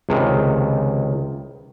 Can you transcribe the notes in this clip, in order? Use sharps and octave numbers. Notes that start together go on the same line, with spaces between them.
C#2 C3 D#3